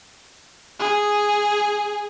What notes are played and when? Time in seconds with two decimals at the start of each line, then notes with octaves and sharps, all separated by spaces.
0.79 G#4